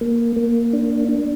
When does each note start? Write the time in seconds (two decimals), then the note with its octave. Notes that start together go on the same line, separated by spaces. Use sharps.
0.01 A#3
0.36 A#3
0.73 D4
1.08 D4